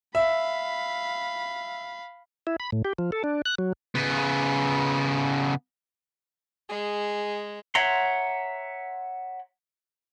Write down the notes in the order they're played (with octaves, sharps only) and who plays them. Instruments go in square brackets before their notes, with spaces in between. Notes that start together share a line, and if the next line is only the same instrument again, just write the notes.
[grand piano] E5 [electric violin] F5 B5
[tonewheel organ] E4
B5
A2
G4
F3
A4
D4
F#6
F#3
[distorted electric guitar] C#3 B3
[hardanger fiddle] G#3 [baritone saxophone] G#4
[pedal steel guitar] C#5 E5 F#5 A#5 C6